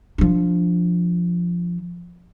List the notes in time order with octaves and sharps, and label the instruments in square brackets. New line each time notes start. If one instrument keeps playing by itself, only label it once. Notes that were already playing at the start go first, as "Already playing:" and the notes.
[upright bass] F3 D4